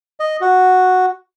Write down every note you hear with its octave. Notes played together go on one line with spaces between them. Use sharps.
D#5
F#4